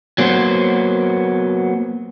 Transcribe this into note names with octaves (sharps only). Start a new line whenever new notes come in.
F#3 A#3 B3 C5